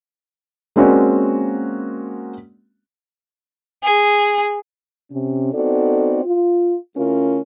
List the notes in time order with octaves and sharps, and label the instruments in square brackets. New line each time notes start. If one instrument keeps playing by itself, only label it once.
[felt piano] G#3 A#3 C4 C#4 F#4 D5
[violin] G#4
[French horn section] C3 C#4
B3 C4 D#4 F#4 A4 D5
F4
C#3 A3 C#4 E4 F4 A#4